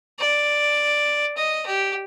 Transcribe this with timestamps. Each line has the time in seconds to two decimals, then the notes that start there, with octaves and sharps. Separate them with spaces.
0.19 D5
1.37 D#5
1.66 G4